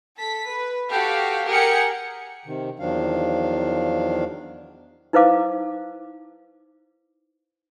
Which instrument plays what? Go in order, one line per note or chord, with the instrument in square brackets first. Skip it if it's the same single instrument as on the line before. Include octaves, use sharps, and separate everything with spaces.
[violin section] A4 B6
B4
F#4 G4 A4 F5
G4 G#4 A#4 F#5 G5 C#7
[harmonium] C3 D#3
E2 D#3 F3 F#3 D4 F5
[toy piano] D#4 E4 B4 C5 F5 D6